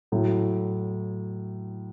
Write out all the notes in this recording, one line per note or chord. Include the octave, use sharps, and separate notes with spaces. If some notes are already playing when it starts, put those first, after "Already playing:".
A2 F#3 A3